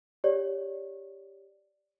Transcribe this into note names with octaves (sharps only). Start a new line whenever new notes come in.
G4 C#5 D5